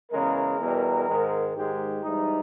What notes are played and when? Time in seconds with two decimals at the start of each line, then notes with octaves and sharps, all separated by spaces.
0.12 E2 C#3 G#3 A#4
0.60 E2 B2 G3
1.08 G#2 D#3 G#3
1.55 G#2 D#3 G#3 G4
2.03 G#2 E3 G3 D#4